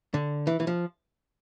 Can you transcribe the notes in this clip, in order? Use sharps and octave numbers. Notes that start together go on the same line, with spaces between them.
D3
E3
E3
F3